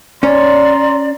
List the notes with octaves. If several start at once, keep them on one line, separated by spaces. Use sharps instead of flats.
C#4 C#5 D5 A#5 C6